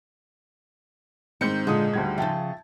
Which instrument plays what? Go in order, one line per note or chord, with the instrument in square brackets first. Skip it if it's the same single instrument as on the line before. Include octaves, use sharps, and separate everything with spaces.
[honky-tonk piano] G#2 G6 C#7 [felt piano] D#3 [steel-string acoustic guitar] C4
[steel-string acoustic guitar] A#2 G#3 [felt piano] D3 F4 D#6
[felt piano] D2 G3 G#6
[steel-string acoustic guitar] C#3 F3 [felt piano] E5 G5 A5